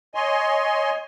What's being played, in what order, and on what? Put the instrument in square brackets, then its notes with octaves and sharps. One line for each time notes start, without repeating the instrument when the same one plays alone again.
[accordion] C#5 D#5 G#5 C6